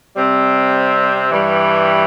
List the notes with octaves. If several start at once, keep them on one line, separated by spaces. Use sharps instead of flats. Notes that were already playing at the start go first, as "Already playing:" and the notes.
C3 G3 C4
G2 E3 G3